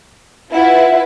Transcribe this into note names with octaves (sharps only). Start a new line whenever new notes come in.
E4 F4 B4 E5 F#5